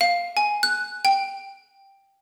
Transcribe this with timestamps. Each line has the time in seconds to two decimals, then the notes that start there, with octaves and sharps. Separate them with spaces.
0.01 F5
0.37 G#5
0.63 F#6
1.05 G5